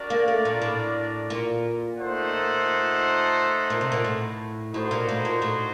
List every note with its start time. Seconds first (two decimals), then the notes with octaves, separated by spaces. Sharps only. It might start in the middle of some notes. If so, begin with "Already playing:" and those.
Already playing: D4 F#4 A#4 D5
0.10 A#3
0.28 A3
0.45 A#2
0.62 A2
1.30 A#2
1.99 A3 D#4 A4 C5 F#5
3.70 A#2
3.81 C3
3.92 A#2
4.04 A2
4.73 A2 D#4 F#4 C5
4.91 A#2
5.09 A2
5.25 A#2
5.42 A2